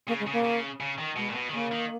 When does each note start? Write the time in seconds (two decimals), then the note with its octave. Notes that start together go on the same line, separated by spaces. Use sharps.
0.07 C#3 A#3
0.20 G#3
0.26 C#3
0.33 A#3
0.44 C#3
0.80 C#3
0.98 D#3
1.16 B2 G#3
1.30 A#2
1.34 B2
1.49 D#3
1.53 C#3 A#3
1.71 D#3